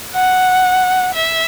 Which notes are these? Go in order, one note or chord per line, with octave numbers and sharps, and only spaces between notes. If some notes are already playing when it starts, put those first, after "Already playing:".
F#5
E5